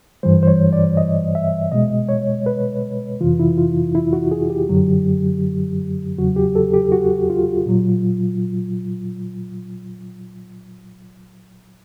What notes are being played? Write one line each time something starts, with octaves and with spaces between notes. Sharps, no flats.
G2 E3 G3 C5
C5
C#5
D5
D#5
E5
B2 G#3 D#5
C#5
B4
F2 C3 E3 F4
E4
F4
E4
F#4
G#4
G4
F#2 D3 F#3
E2 C#3 F#3 F#4
G4
A4
G4
F#4
F4
A#2 F#3